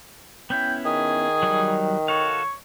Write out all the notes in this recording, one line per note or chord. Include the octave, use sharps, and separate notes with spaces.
B3 C#4 E4 G5
D#3 G#4
F#3 G3
F#4 A4 C#5 F5